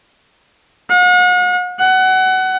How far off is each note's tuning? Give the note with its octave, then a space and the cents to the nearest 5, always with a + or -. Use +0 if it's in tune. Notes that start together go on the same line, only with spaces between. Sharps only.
F#5 -40
F#5 +25